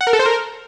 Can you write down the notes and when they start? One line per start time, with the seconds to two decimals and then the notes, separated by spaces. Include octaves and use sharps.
0.01 F#5
0.07 A#4
0.13 A4
0.19 C5
0.26 A#4